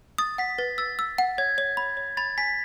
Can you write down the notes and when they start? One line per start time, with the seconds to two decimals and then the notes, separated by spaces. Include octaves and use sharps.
0.18 D#6 A6
0.38 F#5 B6
0.58 B4 A6
0.78 E6 A6
0.99 E6
1.18 F#5
1.38 C#5 G#6
1.58 C#5
1.77 B5
1.97 C#5
2.17 B5 A6
2.38 G#5 B6